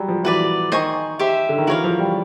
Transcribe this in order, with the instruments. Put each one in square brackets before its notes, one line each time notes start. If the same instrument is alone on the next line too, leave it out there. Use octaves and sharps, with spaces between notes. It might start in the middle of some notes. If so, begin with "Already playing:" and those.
Already playing: [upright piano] F#3 G3
F3
[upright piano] E3 [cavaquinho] F#4 B4 D5
[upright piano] D#3 [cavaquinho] C5 D#5 G#5 C#6
[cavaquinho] G4 C5 E5
[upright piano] D3
D#3
[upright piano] E3 [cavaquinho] F#4 A#4 C#5 F5
[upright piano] F3
G3